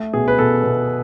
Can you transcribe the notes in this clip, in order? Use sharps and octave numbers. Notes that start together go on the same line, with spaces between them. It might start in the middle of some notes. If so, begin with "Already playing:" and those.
Already playing: A3
B2 G#4
B4
B2 A4
B2